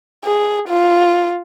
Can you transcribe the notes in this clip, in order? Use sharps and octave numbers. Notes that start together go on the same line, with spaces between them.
G#4
F4